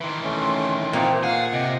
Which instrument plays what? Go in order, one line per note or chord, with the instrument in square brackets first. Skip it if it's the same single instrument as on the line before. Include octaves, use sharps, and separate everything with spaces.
[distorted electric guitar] D#3 E3 [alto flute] C6
[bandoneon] A3 C#4
[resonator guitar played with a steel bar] A#2 [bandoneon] A#3 C4 D#4
[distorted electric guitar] G#4 [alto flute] F5 [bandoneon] F#5
[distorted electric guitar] C3 [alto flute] D#5